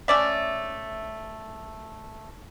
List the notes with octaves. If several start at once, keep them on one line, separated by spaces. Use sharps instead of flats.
A3 C#4 D5 E5